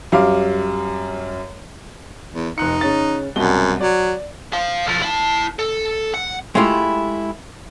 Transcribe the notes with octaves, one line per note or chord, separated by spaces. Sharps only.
F#2 G3 F5 D6
E2
F1 D#4 F#6 C#7
C#3 C#4 A6
C2 F#2 B2 G7
F#3 D5
C5 F5
B1 F3
E4 A5
A4
F#5
G#3 A3 E4 F4 G4